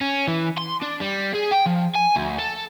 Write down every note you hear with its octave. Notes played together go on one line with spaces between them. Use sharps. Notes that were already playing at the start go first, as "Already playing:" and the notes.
C#4
E3
C6
D4
G3
G#4
G5
F3
G#5
D2
A4